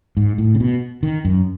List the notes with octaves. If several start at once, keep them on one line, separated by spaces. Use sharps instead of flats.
G#2
A2
C#3
B2
D#3
F#2